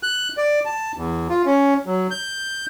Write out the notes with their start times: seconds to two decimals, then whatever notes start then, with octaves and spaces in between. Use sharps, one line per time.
0.03 F#6
0.38 D5
0.65 A5
0.96 E2
1.30 F4
1.46 C#4
1.86 F#3
2.11 G6